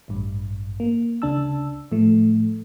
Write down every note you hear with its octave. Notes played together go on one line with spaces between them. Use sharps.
A1 G2
A#3
C#2 C#3 D4 A5 E6
A2 F3 A3